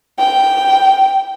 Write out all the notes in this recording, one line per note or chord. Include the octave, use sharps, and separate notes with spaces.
G5